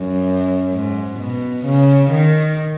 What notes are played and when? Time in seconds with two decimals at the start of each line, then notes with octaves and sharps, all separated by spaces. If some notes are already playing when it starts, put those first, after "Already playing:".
Already playing: F#2
0.73 G#2
1.19 B2
1.65 C#3
2.10 D#3